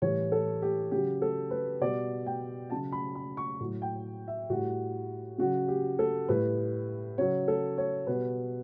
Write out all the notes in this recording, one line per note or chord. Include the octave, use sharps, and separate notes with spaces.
A2 E3 G3 C#5
A4
G4
C#3 F#3 G4
A4
B4
B2 G3 D5
G5
C#3 F#3 A5
B5
B5
C#6
A2 F#3
G5
E5
A2 G3 F#4
C#3 F#3 F#4
G4
A4
A2 G3 B4
C#3 F#3 C#5
A4
C#5
B2 G3 B4